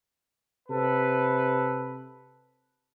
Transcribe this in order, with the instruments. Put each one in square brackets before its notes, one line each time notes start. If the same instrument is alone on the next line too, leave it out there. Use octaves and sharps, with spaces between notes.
[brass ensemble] C3 A4 B4